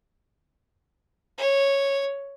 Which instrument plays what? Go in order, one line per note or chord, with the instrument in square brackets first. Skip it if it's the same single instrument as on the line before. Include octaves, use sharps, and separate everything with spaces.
[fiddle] C#5